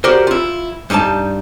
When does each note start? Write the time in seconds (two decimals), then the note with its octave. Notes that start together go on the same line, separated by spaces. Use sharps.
0.04 F#4 G4 A#4 C5 D5
0.27 E4 F4
0.90 G2 G3 D#4 G4 A5